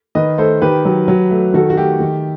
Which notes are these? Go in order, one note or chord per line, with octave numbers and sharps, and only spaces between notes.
D#3 B4 D#5
A3 A4 C5
D#3 G4 B4
F#3
F#3
A3
D#3 F#4 A4
F#4
A3 G4
D#3